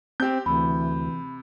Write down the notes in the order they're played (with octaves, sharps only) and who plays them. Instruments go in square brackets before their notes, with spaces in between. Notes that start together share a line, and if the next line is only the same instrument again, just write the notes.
[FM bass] C4 [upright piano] G4 G6
[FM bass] D2 [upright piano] C3 [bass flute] E3 [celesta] B5